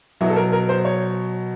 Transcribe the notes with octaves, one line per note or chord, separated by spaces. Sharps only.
B2 F#3 E4
A4
A#4
A#4
C5
C#5